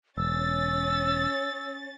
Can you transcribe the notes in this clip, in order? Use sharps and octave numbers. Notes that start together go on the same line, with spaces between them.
E1 C#4 E6 A6